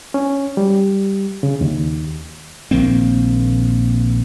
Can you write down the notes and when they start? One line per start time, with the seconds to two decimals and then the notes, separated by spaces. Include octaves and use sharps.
0.14 C#4
0.57 G3
1.43 C#3
1.61 D#2
2.71 A#1 D#3 A#3 C4